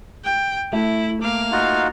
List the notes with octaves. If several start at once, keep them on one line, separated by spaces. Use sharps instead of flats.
G5
A3 E4
A#3 F5 D6
D#4 F4 F#4